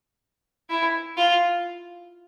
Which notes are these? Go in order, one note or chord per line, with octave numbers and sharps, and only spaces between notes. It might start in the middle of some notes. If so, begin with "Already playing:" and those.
E4
F4